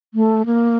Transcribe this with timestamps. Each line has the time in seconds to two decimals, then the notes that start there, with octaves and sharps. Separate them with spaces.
0.14 A3
0.46 A#3